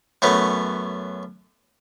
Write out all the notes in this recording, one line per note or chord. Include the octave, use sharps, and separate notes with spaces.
F#2 A3 B3 C#4